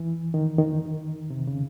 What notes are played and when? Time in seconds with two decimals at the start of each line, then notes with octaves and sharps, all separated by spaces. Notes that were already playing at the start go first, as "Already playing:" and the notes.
Already playing: E3
0.34 D#3
0.58 D#3
1.30 C3
1.47 C#3